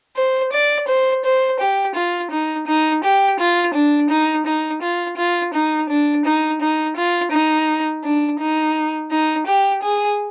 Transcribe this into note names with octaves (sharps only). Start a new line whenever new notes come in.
C5
D5
C5
C5
G4
F4
D#4
D#4
G4
F4
D4
D#4
D#4
F4
F4
D#4
D4
D#4
D#4
F4
D#4
D4
D#4
D#4
G4
G#4